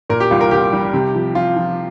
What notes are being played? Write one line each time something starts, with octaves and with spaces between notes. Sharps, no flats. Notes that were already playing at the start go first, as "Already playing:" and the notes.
A#2 A#4
G4
C2 F4
A#4
C2 G4
G3
C3
F3
F3 F4
F3